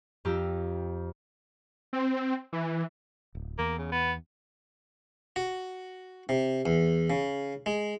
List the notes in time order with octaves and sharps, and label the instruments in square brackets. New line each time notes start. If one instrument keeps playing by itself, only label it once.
[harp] F2 G4 A#5 E6
[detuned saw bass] C4
E3
[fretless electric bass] D1
[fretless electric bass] E2 [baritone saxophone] A#3
[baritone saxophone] C#3
B3
[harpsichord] F#4
C3
E2
C#3
G#3